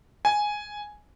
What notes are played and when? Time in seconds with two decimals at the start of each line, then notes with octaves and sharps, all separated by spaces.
0.25 G#5